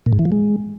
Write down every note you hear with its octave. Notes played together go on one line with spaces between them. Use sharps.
A#2
G#2
E3
F3
G#3